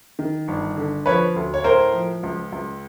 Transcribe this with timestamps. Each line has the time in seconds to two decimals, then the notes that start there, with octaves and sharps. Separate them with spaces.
0.19 D#3
0.48 G1
0.77 D3
1.06 F3 B4 C#5
1.36 D2
1.54 C#5
1.64 A2 A#4 C5
1.93 F3
2.23 C#2
2.52 C#2